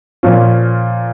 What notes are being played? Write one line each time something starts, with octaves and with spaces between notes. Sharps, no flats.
A#2 F3 C#4 F4